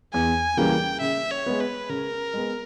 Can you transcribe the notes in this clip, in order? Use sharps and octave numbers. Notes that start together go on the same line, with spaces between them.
E2 G#5
C#3 E3 G3 A#3 G5
C#3 E5
C#5
G#3 B3
B4
C#3 A#4
G#3 B3